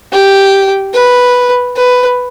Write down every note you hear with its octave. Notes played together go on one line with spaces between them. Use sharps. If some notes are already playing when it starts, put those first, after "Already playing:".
G4
B4
B4